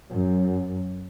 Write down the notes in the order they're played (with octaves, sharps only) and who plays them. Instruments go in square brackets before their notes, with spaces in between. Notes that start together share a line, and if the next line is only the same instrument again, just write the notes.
[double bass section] F#2